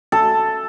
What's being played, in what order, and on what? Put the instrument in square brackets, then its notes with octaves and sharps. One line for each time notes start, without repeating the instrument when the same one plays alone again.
[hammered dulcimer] A4